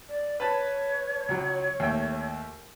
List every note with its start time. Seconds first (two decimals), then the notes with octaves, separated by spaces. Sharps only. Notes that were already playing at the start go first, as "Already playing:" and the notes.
0.08 D5
0.40 B4 C#5 A5 B5
1.29 C#2 F#3
1.80 D#2 A3 G5